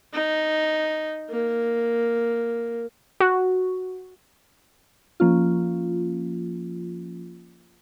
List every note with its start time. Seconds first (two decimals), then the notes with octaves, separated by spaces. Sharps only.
0.13 D#4
1.29 A#3
3.20 F#4
5.20 F3 A#3 C#4 F4